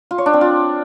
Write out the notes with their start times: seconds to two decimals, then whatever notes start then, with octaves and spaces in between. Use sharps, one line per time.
0.11 F4
0.18 C#5
0.26 D4
0.34 C4
0.41 F4